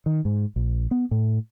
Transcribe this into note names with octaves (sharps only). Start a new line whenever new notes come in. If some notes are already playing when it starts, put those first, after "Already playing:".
D#3
G#2
A#1
B3
A2